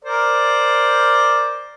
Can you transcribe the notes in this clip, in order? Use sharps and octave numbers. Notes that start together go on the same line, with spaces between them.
A#4 C5 D5